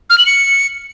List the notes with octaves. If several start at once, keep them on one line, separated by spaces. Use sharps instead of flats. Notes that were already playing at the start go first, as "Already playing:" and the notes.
F6
F#7
C#7